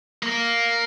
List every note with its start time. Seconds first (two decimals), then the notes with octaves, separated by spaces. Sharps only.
0.23 A#3